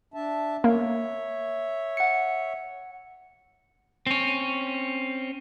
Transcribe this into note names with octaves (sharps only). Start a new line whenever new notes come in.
D4 E5 A5
A#3 C#5 E5
F#5 C#7
C4 C#4